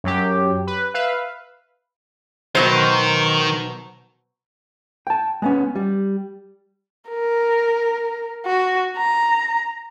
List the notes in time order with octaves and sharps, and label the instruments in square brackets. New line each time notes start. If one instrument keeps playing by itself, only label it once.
[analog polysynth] F#2 F#3 G4
B4
B4 E5 F5
[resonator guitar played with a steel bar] B2 F#3 C5 [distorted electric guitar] D#3 D#4
[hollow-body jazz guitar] G5 A5
G#3 B3 C#4
G3
[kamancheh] A#4
F#4
A#5